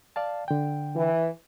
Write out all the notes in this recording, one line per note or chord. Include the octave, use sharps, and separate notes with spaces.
D5 F5 A5
D3 G5
E3